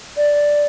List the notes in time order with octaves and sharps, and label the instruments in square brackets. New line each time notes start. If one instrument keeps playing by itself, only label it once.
[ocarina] D5